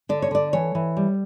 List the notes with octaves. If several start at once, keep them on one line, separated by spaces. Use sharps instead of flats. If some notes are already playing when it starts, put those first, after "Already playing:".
D3 D5
C#5
D3 D5
E3 C#5
E3
G3